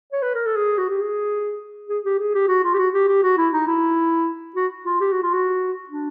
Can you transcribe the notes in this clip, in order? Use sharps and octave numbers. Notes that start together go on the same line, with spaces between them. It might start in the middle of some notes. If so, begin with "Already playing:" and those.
C#5
B4
A#4
A4
G#4
F#4
G4
G#4
G#4
G4
G#4
G4
F#4
F4
G4
F#4
G4
G4
F#4
E4
D#4
E4
F#4
F4
G4
F#4
F4
F#4
D4